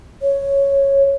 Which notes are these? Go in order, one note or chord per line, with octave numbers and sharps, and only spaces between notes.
C#5